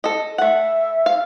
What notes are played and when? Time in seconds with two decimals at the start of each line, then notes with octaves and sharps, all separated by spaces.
0.04 A4 D#5
0.38 A3 E5 F#5
1.06 F5